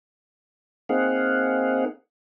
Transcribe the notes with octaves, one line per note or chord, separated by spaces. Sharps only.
A#3 C4 D#4 G#4 F5 F#5